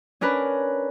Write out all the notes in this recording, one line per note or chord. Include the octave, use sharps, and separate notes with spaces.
C#4 D4 A#4 B4